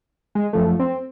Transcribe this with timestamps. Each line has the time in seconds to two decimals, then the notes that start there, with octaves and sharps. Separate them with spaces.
0.35 G#3
0.53 F#2 F3 A3
0.79 C4